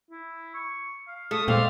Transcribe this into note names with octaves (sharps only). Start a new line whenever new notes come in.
E4
C#6
F5
A3 D#6
A#2 G#3 C4 D5 F5